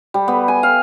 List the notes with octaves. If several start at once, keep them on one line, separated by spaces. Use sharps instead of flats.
G3
B3
G#5
F5